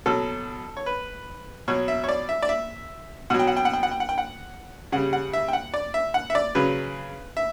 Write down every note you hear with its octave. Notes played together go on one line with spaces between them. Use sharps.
B2 F#3 A4
C#5
B4
B2 F#3 C#5
E5
C#5
D5
E5
D5
E5
B2 F#3 F#5
G5
F#5
G5
F#5
G5
F#5
G5
F#5
G5
F#5
C#3 G3 F#5
F#5
E5
G5
F#5
D5
E5
F#5
E5
D5
C#3 F#3 B4
E5